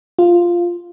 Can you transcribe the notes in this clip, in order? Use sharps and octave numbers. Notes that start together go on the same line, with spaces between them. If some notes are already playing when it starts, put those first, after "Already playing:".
F4